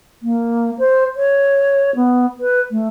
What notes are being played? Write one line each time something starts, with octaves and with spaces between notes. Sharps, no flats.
A#3
C5
C#5
B3
B4
A3